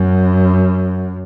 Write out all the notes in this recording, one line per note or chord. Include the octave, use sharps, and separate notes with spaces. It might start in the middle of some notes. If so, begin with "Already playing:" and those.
Already playing: F#2